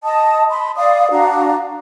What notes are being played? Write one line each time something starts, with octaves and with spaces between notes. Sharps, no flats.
D#5 A5 D#6
B5 C6
D5 F5 D#6
D4 F#4 F5 A#5